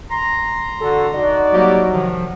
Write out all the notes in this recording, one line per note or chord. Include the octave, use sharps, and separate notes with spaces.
A#5 C6
D3 F#4 A4
D#4 F#4 D5
F#3 G3 A#3 G4
C3 D#3 F3